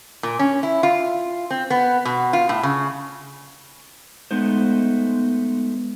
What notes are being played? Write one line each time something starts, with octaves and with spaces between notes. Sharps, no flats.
A#2
C#4
E4
F4
C4
B3
B2
F4
A2
C#3
G#3 A3 B3 D#4 C5